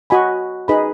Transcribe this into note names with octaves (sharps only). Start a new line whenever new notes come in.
F#4 D#5 G#5 B5
D#4 G#4 B4 D#5 B5